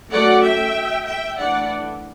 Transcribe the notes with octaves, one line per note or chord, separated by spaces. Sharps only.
F#3 A3 C#4 D5 F#5
E5 G5
E5 G5
E3 A3 D4 D5 F#5